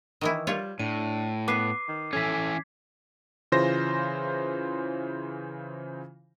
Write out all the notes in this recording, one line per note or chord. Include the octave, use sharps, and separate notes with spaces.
D#3 E3 E4
G3 F4 C#5
A2 D4 D#7
B3 B4 D6 C7
D#3
E3 C#4 A4 G#6 B6
C#3 E3 F4 C5 A#6